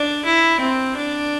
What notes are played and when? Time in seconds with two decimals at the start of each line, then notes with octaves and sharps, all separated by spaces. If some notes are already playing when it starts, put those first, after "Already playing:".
Already playing: D4
0.25 E4
0.60 C4
0.96 D4